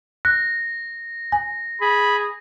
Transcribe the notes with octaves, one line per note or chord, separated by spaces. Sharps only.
F#6 A#6
G#5
G#4 B5